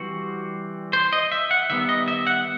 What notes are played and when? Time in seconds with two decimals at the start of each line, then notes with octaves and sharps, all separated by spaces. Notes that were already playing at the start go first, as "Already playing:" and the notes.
Already playing: E3 G3 C4 F#4
0.93 C5
1.13 D#5
1.32 E5
1.51 F#5
1.70 D#3 G3 B3 E5
1.89 D#5
2.08 E5
2.27 F#5